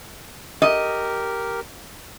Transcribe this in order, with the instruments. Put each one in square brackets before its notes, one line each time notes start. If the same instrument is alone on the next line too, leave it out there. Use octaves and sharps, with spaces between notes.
[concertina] G4 A#4 [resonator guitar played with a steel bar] D#5